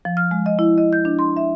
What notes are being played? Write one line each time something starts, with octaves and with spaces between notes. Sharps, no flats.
F3
F6
G#3
D#5
E4
D#5
G6
D4
C6
E5